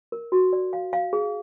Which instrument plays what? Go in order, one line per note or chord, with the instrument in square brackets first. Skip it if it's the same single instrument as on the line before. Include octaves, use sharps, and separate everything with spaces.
[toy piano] A#4
F#4
D5
F5
F5
G#4